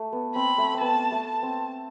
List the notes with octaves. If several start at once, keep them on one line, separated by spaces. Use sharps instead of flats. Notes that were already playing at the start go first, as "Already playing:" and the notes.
Already playing: A3
B3
C4 B5
A3
C4
B3 A5
A3
A5
C4